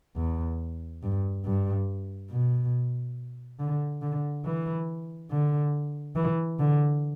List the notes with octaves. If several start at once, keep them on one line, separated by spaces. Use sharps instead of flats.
E2
G2
G2
B2
D3
D3
E3
D3
E3
D3